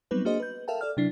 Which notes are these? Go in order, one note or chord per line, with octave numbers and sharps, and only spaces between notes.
F#3 G3 B3 C4 D#4 B4
A#3 D4 F#4 G#4 C5 D#5
B4 G6
A4 A#4 E5 F5 G5 A5
A4 D5 F6
C3 F#3 D4 E4 C7